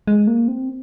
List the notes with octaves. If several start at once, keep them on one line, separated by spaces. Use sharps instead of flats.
G#3
A#3
C4